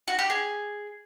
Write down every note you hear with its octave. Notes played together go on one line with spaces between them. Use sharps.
F#4
G4
G#4